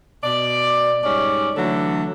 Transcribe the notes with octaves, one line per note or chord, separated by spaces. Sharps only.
B2 D5
G#2 G3 C#4 D5
D3 E3 F#3 A3 A4